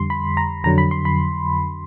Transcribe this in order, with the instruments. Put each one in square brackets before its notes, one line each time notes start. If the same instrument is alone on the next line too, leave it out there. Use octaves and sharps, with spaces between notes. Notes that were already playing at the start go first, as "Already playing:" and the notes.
Already playing: [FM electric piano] F2 D3 G3 C6
B5
A#5
F2 D3 F#3 A#5
B5
C6
B5